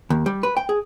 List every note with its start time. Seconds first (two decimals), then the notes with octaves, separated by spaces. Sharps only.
0.10 D#2
0.26 G3
0.43 B4
0.57 G5
0.69 G#4